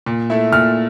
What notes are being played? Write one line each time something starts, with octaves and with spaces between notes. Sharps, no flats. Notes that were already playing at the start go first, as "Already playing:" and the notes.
A#2
A3 E4
A#2 F6